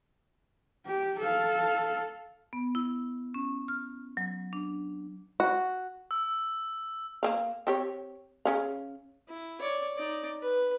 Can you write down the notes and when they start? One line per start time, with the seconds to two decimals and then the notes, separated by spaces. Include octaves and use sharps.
0.86 G4
1.19 A4 F5
2.53 B3
2.75 E4
3.34 C#4
3.68 F6
4.17 F#3
4.53 D4
5.40 F#4
6.11 E6
7.23 A#3 C4 F5
7.67 C4 G4 C#5
8.45 C#3 C#4 F5
9.28 E4
9.61 C#5 D5
9.97 D#4 D5
10.42 B4